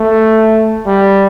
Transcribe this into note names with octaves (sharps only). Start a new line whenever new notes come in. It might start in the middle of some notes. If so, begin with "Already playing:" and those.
Already playing: A3
G3